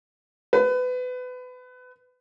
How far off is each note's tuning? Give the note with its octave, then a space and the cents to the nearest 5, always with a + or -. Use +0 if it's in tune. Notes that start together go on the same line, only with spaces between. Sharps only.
B4 +25